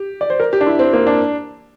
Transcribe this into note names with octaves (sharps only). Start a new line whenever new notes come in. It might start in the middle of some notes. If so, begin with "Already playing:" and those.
Already playing: G4
D5
C5
A#4
G4
D4
E4
C4
A#3
D4